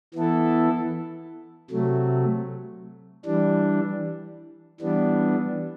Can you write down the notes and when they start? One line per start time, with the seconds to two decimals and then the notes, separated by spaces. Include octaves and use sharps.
0.14 E3 B3 E4 A4
1.70 C3 F#3 A3
3.26 E3 G3 D4
4.80 E3 G3 B3 D4